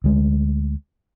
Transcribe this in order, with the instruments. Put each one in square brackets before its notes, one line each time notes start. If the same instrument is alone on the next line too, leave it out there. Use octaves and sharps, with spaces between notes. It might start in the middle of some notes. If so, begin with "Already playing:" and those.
[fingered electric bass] D2 G#3